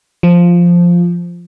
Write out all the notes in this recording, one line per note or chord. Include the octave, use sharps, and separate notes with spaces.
F3